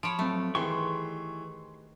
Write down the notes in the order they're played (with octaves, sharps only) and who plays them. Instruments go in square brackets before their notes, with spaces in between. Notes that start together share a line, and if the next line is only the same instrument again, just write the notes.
[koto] F3 C#5 [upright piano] B5 D7
[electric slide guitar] F#3 C4 [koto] A3
[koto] D#3 [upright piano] E3 [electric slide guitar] G4 G#4 B4 [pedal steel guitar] C6 C#6